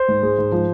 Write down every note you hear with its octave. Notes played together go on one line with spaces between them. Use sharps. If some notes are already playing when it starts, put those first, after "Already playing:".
Already playing: C5
G#2
G#3
G#2
F3